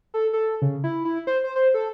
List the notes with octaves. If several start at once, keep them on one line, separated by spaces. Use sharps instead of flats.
A4
A4
C#3
E4
E4
C5
C5
C5
A4